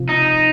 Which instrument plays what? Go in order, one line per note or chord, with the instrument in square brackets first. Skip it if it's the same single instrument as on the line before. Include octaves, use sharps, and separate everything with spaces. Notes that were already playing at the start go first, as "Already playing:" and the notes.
Already playing: [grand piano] C3 F3 F4
[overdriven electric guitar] D#4